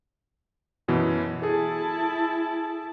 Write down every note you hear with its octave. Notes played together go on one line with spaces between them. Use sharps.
F#2 B2 E3
E4 G#4 A4 A5